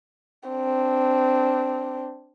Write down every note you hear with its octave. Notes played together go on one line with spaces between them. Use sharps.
C4 D4